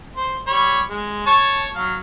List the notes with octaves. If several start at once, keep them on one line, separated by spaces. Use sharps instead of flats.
C5
G3 C#5 B5
G#3
C#5 A5 C#6
F#3 F5